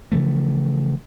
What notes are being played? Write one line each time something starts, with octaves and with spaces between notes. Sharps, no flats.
C#3 E3 F3 A3